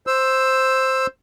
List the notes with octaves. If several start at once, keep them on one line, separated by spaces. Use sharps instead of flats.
C5 E6